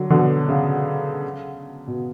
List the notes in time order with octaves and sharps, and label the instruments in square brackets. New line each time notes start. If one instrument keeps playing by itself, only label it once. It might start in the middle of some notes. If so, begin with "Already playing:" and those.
Already playing: [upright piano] D3 F#3
B2 D3
C#3
B2